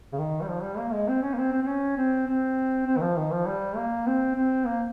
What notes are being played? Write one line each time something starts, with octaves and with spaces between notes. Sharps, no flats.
C#3
D#3
G3
F3
G3
A#3
G#3
C4
C#4
A#3
C4
C4
C4
C#4
C4
C4
C4
D#3
F3
D#3
F3
G3
A#3
C4
C4
A#3